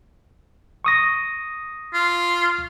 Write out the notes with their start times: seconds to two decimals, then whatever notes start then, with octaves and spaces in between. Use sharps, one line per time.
0.85 C#6 D#6 A#6
1.94 F4